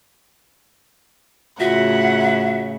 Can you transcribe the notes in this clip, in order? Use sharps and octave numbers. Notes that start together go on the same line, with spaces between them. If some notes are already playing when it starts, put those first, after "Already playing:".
A2 C#3 F4 F#4 E5 F#5 A#6